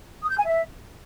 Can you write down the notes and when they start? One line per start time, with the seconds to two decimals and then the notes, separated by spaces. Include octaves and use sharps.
0.23 D#6
0.30 G6
0.37 G#5
0.44 E5